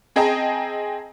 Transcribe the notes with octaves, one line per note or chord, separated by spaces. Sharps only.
C4 G#4 D#5 G5 A5 A#5